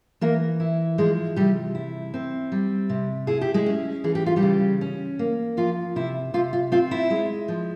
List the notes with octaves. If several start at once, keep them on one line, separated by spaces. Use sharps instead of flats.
E3 A#3 A#4
E4
F3 G#3 G#4
C3 G3 G4
E4
C4
G3
C3
E4 G#4
G4
G#3 G#4
C#4
E3 G#4
G4
F4
G3 G4
C#3
C#4
A#3
F3 F4
C3 E4
C3 F4
F4
C4 F4
E4
G#3
F3